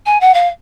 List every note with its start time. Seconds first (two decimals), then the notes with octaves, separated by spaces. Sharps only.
0.06 G#5
0.21 F#5
0.34 F5